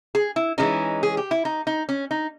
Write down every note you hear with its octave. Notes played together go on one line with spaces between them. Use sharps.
G#4
E4
E3 G#3 C#4 D#4
G#4
G4
E4
D#4
D#4
C#4
D#4